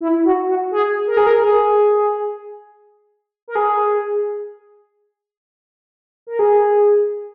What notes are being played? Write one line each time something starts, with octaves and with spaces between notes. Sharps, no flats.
E4
F#4
F#4
G#4
A#4
G#4
A#4
G#4
A#4
G#4
A#4
G#4